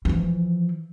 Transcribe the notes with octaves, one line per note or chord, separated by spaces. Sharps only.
E3 F3